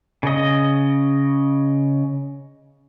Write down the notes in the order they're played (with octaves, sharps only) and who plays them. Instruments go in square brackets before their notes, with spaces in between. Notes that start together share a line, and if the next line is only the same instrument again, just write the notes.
[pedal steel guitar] C#3 D#5